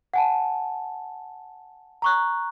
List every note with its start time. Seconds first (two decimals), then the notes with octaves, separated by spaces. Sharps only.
0.14 F#5 G#5 A5
2.02 A#5 C#6 F#6